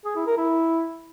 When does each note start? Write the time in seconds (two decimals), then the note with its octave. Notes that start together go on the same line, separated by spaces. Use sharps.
0.05 G#4
0.16 E4
0.27 A#4
0.37 E4